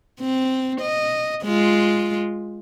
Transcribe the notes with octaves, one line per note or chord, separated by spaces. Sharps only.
C4
D#5
G#3 F4